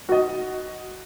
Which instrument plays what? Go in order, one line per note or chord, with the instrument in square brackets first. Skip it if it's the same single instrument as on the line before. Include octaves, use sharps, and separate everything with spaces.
[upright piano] F#4 D#5